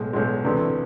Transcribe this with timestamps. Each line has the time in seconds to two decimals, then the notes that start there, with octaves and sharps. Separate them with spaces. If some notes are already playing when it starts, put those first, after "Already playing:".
Already playing: B1 A2 G#3
0.13 B1 A2 G#3
0.44 D2 C3 E3 A3